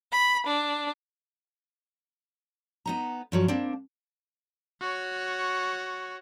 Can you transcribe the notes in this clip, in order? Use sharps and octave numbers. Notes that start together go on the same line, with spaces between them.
B5
D4
B3 D#4 A#5
G2 F3 F#3
A#3 C4 D4
F#4 C#5